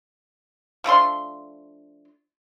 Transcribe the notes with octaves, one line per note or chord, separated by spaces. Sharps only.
F3 A3 D4 C6